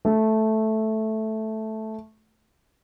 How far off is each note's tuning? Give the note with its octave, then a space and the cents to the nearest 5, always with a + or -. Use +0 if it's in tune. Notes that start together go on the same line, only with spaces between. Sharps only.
A3 -5